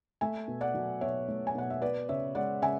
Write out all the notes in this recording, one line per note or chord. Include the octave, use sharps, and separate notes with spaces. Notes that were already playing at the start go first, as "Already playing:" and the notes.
A3 E5 G#5
B2
D5 F#5
F#3
B2 C#5 E5
A3
G#5
B2 F#5
E5
B3 B4 D5
C#3 C#5 E5
G#3 D5 F#5
C#3 E5 G#5